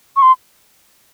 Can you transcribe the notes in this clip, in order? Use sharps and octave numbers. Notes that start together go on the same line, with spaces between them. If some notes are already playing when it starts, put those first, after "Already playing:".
C#6
C6